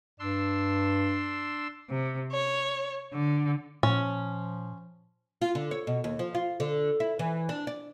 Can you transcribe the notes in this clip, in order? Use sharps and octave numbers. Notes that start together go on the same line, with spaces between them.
G2 D4 C6 E6
C3
C#5
D3
A#2 F3 C#4
F4
D3
C#5
B2
D#2
F3
F4
D3
E4
E3
D4
D5